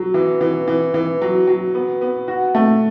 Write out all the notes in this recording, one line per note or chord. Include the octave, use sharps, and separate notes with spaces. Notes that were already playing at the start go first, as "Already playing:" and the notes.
Already playing: F#3
E3
E3
E3
E3
F#3
F#3
B3
B3
F#4
A3